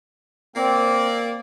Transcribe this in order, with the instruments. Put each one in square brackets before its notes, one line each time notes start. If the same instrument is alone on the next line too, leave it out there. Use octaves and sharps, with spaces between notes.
[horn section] A#3 D5 [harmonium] C4